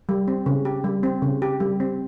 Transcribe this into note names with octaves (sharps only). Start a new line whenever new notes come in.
G3
C4
C#3
G4
G3
C4
C#3
G4
G3
C4